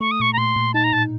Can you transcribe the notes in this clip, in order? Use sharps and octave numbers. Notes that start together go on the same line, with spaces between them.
A3 C#6
D#6
A#2 C#6
A#5
A#2 C6
A#2
D#4 A5
A#5
A2 A5